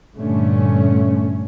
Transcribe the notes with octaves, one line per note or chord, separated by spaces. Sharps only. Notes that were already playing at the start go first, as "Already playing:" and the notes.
G2 A#2 D3 A3 C#4